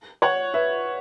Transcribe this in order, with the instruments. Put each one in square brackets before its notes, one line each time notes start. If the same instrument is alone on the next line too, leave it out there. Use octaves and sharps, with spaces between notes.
[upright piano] C#5 F#5
B4 E5